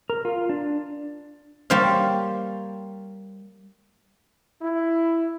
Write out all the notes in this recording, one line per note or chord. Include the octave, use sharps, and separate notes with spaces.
A#4
F4
D4
G3 A#3 C5 C#5 F5
E4